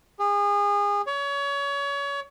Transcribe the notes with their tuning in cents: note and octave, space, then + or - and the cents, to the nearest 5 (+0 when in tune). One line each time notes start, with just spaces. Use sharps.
G#4 -30
C#5 +30